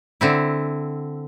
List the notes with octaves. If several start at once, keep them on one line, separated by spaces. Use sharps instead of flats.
D3 C4 E4